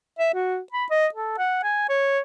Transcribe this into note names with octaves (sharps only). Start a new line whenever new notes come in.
E5
F#4
B5
D#5
A4
F#5
G#5
C#5